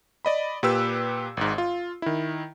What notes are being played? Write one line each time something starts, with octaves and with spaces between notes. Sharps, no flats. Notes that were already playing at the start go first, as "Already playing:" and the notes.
D5 D#5 B5
A#2 G4 B4 E6
G#1 G#2
F4
D#3 E4